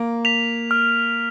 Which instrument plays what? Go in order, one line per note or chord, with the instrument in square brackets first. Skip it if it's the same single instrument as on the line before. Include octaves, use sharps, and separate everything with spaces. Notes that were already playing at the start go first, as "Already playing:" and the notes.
Already playing: [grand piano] A#3
[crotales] B6 F7
F6